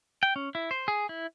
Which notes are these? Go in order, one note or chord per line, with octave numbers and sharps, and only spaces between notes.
G5
C#4
E4
C5
G#4
E4